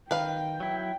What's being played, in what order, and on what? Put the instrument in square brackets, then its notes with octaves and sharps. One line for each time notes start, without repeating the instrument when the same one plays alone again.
[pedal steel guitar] D#3 [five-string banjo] B4 F5 [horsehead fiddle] G5
[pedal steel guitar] F#3 E4